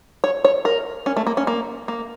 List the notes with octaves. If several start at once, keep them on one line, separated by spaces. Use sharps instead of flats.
C#5
C#5
A#4
C#4
A3
A#3
C#4
A#3
A#3